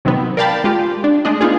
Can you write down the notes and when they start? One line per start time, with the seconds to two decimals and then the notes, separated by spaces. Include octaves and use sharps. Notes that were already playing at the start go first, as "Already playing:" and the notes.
0.05 C3 D#3 F#3 B3
0.37 A#4 D5 F5 G5 A5 B5
0.64 G#3 F4 G4
1.04 D4
1.25 G#3 A3 D4 D#5
1.41 B3 D#4 F4 G#4